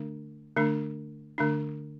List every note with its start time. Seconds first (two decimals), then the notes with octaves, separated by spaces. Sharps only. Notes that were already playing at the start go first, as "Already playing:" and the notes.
Already playing: D3 A3 D4
0.56 D3 A3 D4
1.38 D3 A3 D4